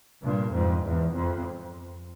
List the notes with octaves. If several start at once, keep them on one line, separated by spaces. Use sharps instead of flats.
G2 A#2
F2 G#2
E2
F2